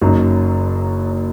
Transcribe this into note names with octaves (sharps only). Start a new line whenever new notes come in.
F#1 F#2 F#3 D#4